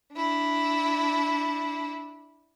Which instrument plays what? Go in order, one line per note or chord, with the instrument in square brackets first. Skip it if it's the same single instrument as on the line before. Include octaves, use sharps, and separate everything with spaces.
[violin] D4 E4